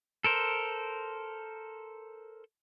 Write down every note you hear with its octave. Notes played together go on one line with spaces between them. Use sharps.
A4 A#4 C5